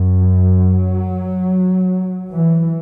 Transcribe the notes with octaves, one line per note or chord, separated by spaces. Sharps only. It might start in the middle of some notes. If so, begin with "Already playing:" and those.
Already playing: F#2
F#3
E3